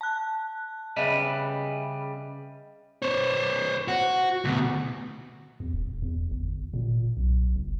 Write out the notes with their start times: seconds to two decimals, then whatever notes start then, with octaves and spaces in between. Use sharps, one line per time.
0.01 A5 F#6
0.97 C#3 G3 B4 D#5 E5
3.02 C5 C#5
3.88 F#4
4.45 D2 B2
5.60 E2
5.73 D#1
6.02 E2
6.31 G1
6.74 A#2
7.17 B1
7.56 F#1